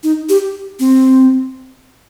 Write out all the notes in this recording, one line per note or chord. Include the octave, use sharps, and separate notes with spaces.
D#4
G4
C4